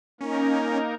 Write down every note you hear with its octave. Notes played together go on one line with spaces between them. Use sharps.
A#3 C#4 D#4 A#4